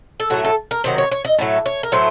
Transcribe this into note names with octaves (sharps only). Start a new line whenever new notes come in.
A4
A2 F#3 A3 F#4
A4
A#4
C3 D#3 F#3 C5
C#5
C#5
D#5
A2 F#3 A3
C#5
A#4
A2 F#3 A3 C5